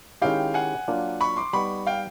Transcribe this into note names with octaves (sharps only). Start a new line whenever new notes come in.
D#3 G#3 C#4 E4 G4 F5 G5
F#5 G#5
F#3 A#3 D4 F4
B5 C#6
C6 D6
G3 B3 D#4 B5 C#6
F5 G5